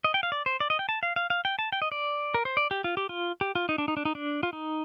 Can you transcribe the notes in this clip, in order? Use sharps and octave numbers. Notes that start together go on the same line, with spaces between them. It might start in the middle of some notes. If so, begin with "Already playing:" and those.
D#5
G5
F5
D5
C5
D5
D#5
G5
A5
F5
F5
F5
G5
A5
G5
D#5
D5
A#4
C5
D5
G4
F4
G4
F4
G4
F4
D#4
D4
D#4
D4
D#4
D4
F4
D#4